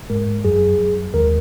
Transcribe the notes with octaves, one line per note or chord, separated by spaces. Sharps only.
G#2 G#3 A#4
F#2 F#3 G#4
F#2 F#3
D#2 D#3 G#3 A#4